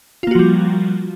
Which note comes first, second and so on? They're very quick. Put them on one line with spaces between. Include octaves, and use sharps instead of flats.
F4 A#3 F#4 F3 G3